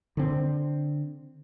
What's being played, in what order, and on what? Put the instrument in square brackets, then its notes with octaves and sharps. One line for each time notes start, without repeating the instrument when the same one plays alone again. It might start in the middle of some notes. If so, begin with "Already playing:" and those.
[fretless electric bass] D3 C4